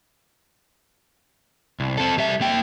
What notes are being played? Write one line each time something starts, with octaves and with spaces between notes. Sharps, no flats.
C2
C4 A4
G3 E5
A#3 G5